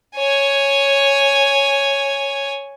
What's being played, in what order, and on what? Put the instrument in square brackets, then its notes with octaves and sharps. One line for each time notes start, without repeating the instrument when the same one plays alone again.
[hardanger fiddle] C#5 G#5